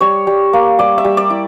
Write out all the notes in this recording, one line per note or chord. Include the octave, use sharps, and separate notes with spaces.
G3 C#5
G3
A#3
G3 D5
E5
G3
D5
E4